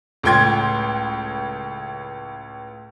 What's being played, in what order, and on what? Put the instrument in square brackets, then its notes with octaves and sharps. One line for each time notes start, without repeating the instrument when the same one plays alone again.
[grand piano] C#2 A2 G5 C6 G#6